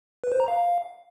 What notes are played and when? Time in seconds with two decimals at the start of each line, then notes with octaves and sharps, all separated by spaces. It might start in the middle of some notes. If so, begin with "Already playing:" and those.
0.24 B4
0.32 C5
0.40 A#5
0.48 F5